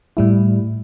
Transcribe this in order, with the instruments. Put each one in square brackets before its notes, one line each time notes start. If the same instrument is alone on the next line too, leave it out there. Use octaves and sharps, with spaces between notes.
[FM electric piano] A2 G3 E4